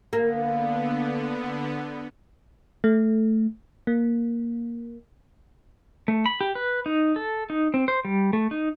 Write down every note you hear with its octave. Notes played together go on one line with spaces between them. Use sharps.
D3 A#3 B3
A3
A#3
A3
B5
G4
B4
D#4
A4
D#4
C4
C5
G3
A3
D#4